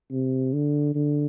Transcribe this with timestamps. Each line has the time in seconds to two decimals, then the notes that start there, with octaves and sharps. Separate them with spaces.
0.11 C3
0.53 D3
0.95 D3